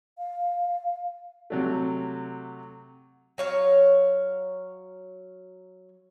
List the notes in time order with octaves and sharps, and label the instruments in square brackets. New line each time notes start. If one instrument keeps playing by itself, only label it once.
[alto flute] F5
[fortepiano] C3 F#3 A3
[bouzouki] F#3 C#5 F5